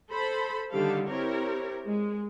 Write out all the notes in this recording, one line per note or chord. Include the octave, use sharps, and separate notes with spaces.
A4 C5 B5
D3 D#3 G3 G4 A4 F5
C4 E4 G4 A#4 C#5
G#3